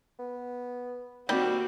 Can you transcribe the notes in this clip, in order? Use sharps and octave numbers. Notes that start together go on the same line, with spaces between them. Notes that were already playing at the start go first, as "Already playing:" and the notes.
B3
D#3 G3 A#3 C4 F#4 G4